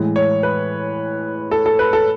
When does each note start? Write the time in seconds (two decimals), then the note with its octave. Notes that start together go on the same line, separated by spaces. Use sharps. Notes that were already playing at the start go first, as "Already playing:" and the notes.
Already playing: A2 E3 G#3
0.16 C#5
0.43 B4
1.51 A4
1.66 A4
1.79 B4
1.93 A4